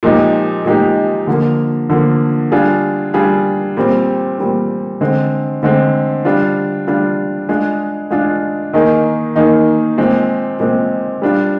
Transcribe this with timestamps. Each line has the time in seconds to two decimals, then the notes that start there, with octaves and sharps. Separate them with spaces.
0.03 A#2 F3 G#3 D#4 G4
0.65 A#2 F3 G#3 D#4 G4
1.27 D3 F3 A#3
1.90 D3 F3 A#3
2.52 G3 D4 F4 G#4
3.14 G3 D4 F4 G#4
3.77 A#2 G3 C4
4.39 A#2 G3 C4
5.01 D3 G#3 C4
5.63 D3 G#3 C4
6.25 G3 D4 F4
6.87 G3 D4 F4
7.49 G#3 D4 F4 G#4
8.11 G#3 D4 F4 G#4
8.73 D#3 A#3 D#4 G#4
9.35 D#3 A#3 D#4 G#4
9.97 A#2 G#3 C4
10.60 A#2 G#3 C4
11.22 G3 D4 F4